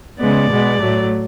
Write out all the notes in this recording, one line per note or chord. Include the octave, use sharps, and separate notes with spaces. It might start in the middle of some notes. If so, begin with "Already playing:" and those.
C#3 G#3 B3 D5
B2 G#3 B3
A2 F#3 A3